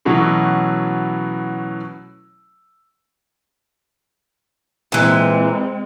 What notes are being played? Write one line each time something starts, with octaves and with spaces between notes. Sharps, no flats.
B2 E3 F#3 A3 C#4 E4
A#2 E3 G#3 C4